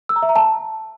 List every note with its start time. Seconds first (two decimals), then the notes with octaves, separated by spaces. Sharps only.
0.09 E6
0.16 A#5
0.22 E5
0.29 A#5
0.36 A5